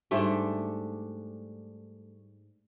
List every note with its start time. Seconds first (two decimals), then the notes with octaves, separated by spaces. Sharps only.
0.11 G#2 G3 A3 D4